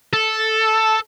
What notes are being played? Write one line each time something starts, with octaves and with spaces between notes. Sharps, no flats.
A4